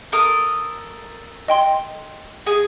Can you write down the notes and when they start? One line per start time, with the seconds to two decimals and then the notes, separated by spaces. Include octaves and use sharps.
0.12 A4 A#4 D#6
1.48 D#5 G5 C6
2.46 G#4